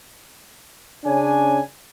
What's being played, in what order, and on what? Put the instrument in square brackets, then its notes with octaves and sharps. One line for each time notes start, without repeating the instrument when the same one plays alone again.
[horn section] C#3 C#4 D4 G#5